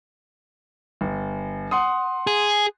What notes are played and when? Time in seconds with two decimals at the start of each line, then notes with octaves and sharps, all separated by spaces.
1.01 G1
1.71 F#5 C6 D#6
2.27 G#4